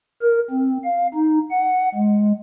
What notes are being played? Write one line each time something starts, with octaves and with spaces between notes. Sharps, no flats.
A#4
C4
F5
D#4
F#5
G#3